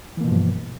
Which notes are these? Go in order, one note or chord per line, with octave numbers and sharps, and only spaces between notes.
G2 B2 E3 F3 A#3